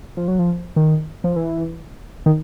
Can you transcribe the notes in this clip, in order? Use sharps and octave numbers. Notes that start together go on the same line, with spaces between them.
F3
F#3
F3
D#3
F3
E3
D#3